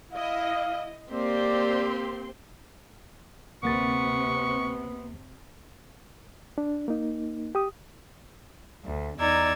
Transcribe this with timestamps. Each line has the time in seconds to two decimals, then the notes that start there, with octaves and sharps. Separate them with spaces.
0.13 E4 D#5 F5
1.13 A#3 C4 G4 D5 C6
3.63 D2 C3 A#3 B3 C#6 A6
6.58 D4
6.88 A#3 D#4
7.55 G4 D#6
8.83 D2
9.19 E2 D#4 D5 A#5 E6 G#6